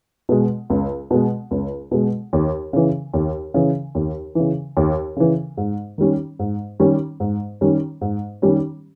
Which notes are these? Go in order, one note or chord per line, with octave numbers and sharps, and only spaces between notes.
B2 G#3
C#2
B2 G#3
C#2
B2 G#3
D#2
C#3 E3
D#2
C#3 E3
D#2
C#3 E3
D#2
C#3 E3
G#2
D#3 G3 C#4
G#2
D#3 G3 C#4
G#2
D#3 G3 C#4
G#2
D#3 G3 C#4